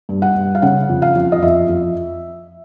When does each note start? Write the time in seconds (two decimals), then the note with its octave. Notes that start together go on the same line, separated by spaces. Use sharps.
0.09 G2
0.22 F#5
0.35 G2
0.55 F5
0.62 C#3 F#5
0.89 F2
1.02 F5
1.15 F2
1.32 D#5
1.42 F2 E5
1.69 F2